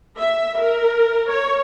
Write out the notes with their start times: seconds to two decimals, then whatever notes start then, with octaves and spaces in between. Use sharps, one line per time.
0.19 E5
0.58 A#4
1.29 C#5